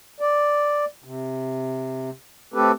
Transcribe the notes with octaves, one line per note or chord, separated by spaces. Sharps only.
D5
C3
A3 C4 G4 A4 B4